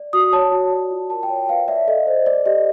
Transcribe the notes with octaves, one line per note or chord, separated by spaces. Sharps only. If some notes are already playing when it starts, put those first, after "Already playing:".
Already playing: D5
F#4 D#6
C#5 A5
F#4
D5
F4
A#4 A5
G5
C#5
B4 F5
D5 E5
A4 D#5
C5
D5
G4 D#5